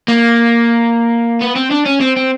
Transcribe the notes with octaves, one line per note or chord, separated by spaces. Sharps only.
A#3
B3
C4
D4
C#4
C4
C4